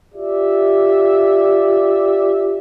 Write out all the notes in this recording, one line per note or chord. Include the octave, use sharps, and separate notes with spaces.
F4 G4 D5 E5